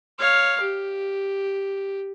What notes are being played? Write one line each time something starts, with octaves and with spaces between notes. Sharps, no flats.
C#5 F5
G4